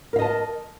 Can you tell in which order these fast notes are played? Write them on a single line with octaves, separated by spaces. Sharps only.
A#4 F5 D#5 A5